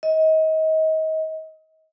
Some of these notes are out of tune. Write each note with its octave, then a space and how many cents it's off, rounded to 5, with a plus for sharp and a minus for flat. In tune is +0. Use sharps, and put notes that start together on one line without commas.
D#5 +30